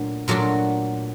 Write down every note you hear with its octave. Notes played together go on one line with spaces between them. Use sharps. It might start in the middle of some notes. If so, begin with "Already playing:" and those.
Already playing: A#2 F#3 A3 D4
A#2 F#3 A3 D4 F#4